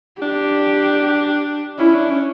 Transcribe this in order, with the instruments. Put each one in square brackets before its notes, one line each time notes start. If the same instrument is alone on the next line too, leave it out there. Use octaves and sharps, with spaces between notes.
[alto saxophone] D4 [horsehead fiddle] G4
[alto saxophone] C#4 [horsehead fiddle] E4
[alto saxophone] D4
C#4